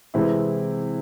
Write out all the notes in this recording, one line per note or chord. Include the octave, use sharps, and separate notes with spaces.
C3 E3 G#3 C4 E4